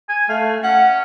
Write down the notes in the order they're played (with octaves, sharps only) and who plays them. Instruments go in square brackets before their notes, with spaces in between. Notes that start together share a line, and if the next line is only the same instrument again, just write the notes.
[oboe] G#5
[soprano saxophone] A3 [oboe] F5
[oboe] C#4 [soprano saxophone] F#5